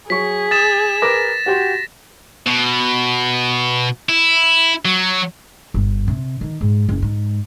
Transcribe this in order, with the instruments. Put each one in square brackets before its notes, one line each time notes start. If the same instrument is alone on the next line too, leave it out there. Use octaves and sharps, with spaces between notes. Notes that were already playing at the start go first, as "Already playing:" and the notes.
[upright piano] F#3 C#6 [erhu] G#4 [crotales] B6
[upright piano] D#6 [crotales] A6 E7
[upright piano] A#4 B4 D6 [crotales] A#6
[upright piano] F#4 G4 C6
[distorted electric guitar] B2
E4
F#3
[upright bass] G1
C3
D#3
G#2
F#1
G#2